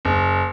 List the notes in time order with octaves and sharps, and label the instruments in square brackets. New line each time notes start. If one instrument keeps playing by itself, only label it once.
[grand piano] F#1